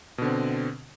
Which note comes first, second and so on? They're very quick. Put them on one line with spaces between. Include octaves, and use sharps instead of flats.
B2 D3 C4